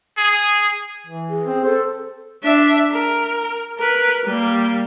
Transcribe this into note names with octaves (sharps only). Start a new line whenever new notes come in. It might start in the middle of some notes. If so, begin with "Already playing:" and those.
G#4
E3
G#4
C4
A4 C5
D4 E5
A#4
A#4 B4
G3 A#3